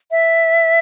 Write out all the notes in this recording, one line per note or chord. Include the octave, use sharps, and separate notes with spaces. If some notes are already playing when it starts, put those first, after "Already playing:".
E5